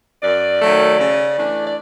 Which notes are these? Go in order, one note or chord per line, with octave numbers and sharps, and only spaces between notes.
F#2 D5
D#3 F#3 A3
C#3
E3 A3 D4
D5